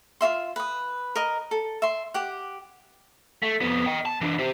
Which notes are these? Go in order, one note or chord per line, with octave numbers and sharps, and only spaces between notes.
F4 F#4 E5 C6
B4 D#6
A#4 D#5
A4
E5 C6
G4 F#5
A3
F2 B3
D#5 G5
A5
E3 D4
G4 C5